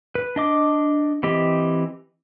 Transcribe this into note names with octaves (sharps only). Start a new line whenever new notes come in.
B4
D4 D#5 D6
E3 C4 G4 D#5